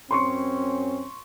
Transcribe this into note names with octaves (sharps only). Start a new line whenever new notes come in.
F#2 C4 C#4 C6 C#6 C#7